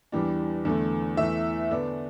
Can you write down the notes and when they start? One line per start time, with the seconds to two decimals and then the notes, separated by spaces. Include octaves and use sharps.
0.12 E2 E3 G3 D4
0.65 E2 D3 A3
1.17 E2 E3 A3 E5
1.70 D3 B3 D4